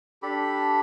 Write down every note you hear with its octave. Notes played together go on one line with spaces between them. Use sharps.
D4 G4 A4 B5